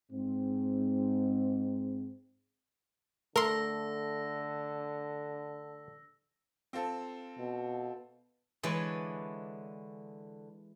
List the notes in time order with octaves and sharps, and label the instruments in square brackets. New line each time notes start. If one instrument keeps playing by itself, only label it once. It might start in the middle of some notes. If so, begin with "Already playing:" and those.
[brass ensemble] G#2 C4
[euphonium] D3 [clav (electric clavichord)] A3 [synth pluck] A#4 C6 [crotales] E6 A#6
[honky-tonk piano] C4 F4 A4
[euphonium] B2
[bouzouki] D3 B4 C#5 [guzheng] E3 G#3 D5